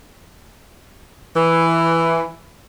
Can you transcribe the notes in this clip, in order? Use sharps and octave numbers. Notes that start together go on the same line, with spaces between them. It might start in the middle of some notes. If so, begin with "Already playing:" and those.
E3